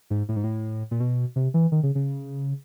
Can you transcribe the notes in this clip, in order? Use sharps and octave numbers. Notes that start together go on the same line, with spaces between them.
G#2
A2
G#2
A2
A#2
B2
C3
E3
D#3
C#3
C#3